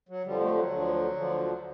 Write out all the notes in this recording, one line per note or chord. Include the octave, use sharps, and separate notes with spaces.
F#3
F2 D3 F3 G3
A3
F#3
D2 D3 F3
D2 D3 F3